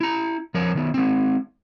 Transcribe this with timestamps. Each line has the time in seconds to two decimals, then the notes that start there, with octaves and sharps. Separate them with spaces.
0.01 E4 A#5
0.54 F3 A#4 C#5
0.75 D#3 B3
0.94 G#3 C4